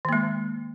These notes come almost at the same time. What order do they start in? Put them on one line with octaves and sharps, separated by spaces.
D#3 A#3 G#3